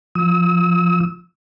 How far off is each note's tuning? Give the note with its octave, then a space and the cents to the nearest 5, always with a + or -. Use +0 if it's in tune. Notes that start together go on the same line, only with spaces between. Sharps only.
F3 +0 E6 -45